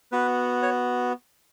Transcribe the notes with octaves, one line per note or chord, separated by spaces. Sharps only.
B3 F#4 B4
C#5